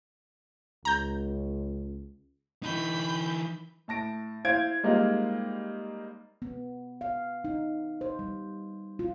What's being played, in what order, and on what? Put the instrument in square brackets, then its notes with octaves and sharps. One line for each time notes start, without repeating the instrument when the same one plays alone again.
[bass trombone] C#2 [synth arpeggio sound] A#5 G6
[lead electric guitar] E3 D#4 [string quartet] B5 G6
[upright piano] A2 A5 A#6 D7
E4 C5 F5 G#6 D7
G3 G#3 A#3 C4 D#4 F4
[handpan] B3
F5
D#4
C5
G3
F4